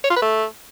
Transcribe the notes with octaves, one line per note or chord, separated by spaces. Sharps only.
C#5
F4
B4
A3